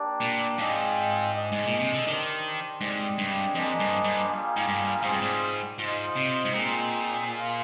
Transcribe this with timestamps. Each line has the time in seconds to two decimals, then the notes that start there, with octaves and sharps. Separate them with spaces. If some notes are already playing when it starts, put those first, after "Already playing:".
Already playing: A#3 D4 G4 D5
0.20 A#2
0.57 G#2 C4 F4 G#4 D#5 G5
1.32 D4 G#4 D#5
1.52 G#2
1.65 A#2
1.79 C3
1.92 D3
2.06 D#3 D4 G4 C5
2.81 G#2 G#3 C4 G4 D5 G5
3.18 G2
3.55 F2 A#3 D4 G#4 C5 D#5
3.80 G2
4.04 G2
4.29 G3 A#3 F4 G#4
4.56 G#2
4.67 G2
5.03 G#2 G3 C4 F4 G#4 C5
5.13 G2
5.21 G#2
5.78 G#2 F4 C5 D#5
6.15 C3
6.45 G#2
6.52 A#2 C4 D#4 G#4 D#5
7.27 F4 G#4 C5 F5